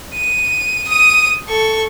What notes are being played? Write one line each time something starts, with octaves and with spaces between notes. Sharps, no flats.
D#7
D#6 D#7
A4 C#6